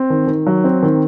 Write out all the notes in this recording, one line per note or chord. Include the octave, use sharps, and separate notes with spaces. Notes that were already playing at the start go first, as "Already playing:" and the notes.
Already playing: C4
D#3
D#3
F#3
C4
D#3